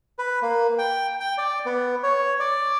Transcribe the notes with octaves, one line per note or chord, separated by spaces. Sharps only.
B4
A#3
G5
G5
D5
B3
C#5
D5